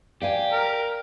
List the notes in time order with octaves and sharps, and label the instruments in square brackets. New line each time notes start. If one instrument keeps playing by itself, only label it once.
[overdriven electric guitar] G4 [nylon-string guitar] D5 F5 G#5
[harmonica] A#4